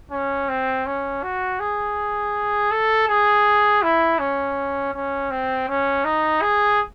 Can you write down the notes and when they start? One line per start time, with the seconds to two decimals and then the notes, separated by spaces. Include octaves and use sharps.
0.11 C#4
0.49 C4
0.86 C#4
1.23 F#4
1.60 G#4
2.71 A4
3.08 G#4
3.82 E4
4.19 C#4
4.94 C#4
5.31 C4
5.68 C#4
6.04 D#4
6.42 G#4